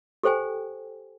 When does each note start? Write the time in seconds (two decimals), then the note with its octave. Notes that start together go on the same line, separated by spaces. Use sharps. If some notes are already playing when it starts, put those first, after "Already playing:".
0.23 G4 A4 C5 G5 G#5